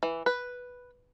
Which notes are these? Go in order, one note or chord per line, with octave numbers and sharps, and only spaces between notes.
E3
B4